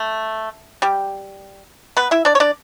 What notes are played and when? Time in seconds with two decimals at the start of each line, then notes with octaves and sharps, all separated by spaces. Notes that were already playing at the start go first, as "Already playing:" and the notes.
Already playing: A3
0.82 G3 G4
1.97 B3 B4
2.11 E4 E5
2.25 D4 D5
2.35 C#5
2.40 D4 D5